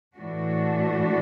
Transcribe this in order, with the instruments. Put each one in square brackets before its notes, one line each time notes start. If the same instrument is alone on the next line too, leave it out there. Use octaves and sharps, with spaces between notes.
[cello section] A2 E3 A3 D4 F#4